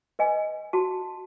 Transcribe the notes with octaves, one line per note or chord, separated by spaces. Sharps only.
B4 D#5 G#5
F#4 A5